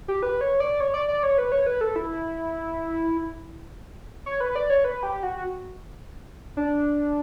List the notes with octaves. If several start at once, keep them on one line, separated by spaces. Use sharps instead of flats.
G4
B4
C#5
D5
C#5
D5
D5
C#5
B4
C#5
B4
A4
E4
C#5
B4
D5
C#5
B4
G4
F#4
D4